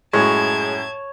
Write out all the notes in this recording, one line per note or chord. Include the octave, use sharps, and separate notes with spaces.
F#2 A2 G#3 C#5 A5 G#6